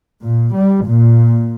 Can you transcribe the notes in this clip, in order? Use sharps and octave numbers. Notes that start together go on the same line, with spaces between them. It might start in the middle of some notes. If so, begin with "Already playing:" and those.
A#2
G3
A#2